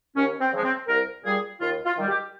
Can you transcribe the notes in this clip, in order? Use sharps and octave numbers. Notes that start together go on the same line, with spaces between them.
D#2 C#4
C4
C#3 F3 G#3
C4
C2 A#4
A#2 G3 G#4
D#2 F4
F4
D#3 G3
G4